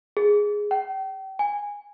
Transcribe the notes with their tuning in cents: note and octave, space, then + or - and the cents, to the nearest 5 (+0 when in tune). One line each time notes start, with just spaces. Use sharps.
G#4 +0
G5 -35
G#5 -15